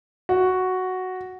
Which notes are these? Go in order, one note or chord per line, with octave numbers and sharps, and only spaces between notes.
F#4